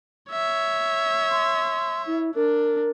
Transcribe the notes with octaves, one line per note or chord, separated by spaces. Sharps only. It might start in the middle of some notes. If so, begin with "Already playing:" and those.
C#5 E5
C6
E4
D4 A#4